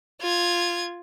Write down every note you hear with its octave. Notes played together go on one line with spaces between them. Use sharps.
F4 G#6